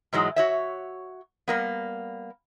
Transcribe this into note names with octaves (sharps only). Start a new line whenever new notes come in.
G#2 E3 F#3 G#3
F#4 C#5 E5
G3 A#3 B3